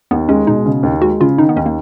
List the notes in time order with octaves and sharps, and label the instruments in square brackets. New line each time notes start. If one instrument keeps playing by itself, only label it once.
[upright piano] D#2 [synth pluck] B3
[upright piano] G#3 [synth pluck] C#4
[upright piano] B2 [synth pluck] D#4
[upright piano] C#3
D#2
[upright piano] G#3 [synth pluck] F#4
[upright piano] C#3 [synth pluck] F4
[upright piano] D#3 [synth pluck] D#4
[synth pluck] B3
[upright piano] D#2 [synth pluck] C#4
[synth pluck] A#3